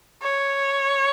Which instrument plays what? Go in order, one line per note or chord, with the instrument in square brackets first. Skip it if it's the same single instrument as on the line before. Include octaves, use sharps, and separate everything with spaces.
[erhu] C#5